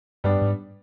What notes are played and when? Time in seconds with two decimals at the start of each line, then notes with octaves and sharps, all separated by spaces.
0.24 G2 G3 B3 D4
0.41 G#2